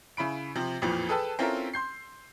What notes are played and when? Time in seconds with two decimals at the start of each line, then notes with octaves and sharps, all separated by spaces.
0.17 C#3 E4 B5 D7
0.55 C3 F3
0.82 A1 F2 A#2 E3 F3
1.09 G#4 A4 B4 G5 A5 E6
1.39 C4 C#4 E4 F4 A4 A#4
1.74 C6 G6 C7